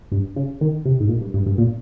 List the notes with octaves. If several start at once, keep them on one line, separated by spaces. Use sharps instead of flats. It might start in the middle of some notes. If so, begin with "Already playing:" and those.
G2
C#3
D#3
C3
G#2
A#2
G2
G2
G2
A#2